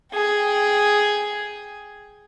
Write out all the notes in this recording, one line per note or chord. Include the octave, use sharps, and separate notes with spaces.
G#4 G5